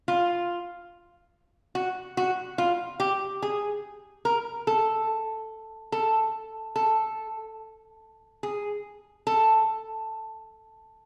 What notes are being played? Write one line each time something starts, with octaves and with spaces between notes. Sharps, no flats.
F4
F#4
F#4
F4
G4
G#4
A#4
A4
A4
A4
G#4
A4